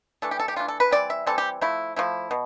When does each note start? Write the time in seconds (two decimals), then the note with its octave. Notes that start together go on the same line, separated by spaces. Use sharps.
0.22 E3 A3 D4 A4
0.31 G4
0.39 A4
0.48 G4
0.56 E3 A3 D4 F4
0.68 A4
0.80 B4
0.91 E3 G3 C4 D5
1.10 E5
1.27 E3 G3 C4 A4
1.38 G4
1.61 F3 A3 E4
1.96 F3 A3 E4
2.31 B2